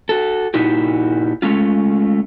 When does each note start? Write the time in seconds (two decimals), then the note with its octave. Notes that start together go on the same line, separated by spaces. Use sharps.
0.09 F#4 A4
0.54 A#2 D#4 E4 F#4 G4
1.42 G#3 A3 C#4 F4